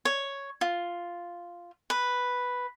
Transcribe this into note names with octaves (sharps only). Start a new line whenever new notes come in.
C#5
F4
B4